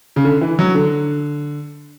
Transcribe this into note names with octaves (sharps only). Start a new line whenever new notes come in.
C#3
D3
E3
F#3
D3